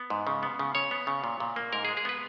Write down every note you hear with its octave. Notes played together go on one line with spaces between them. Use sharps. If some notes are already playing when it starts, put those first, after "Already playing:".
Already playing: B3
G#2
C#3
B3
C#3
C#3 C#5
B3
C#3
A#2
A#2
A#3
G#2 A#4
G#4
G#3
G#4
B3 B4